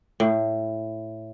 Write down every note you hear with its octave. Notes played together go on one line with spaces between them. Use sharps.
A2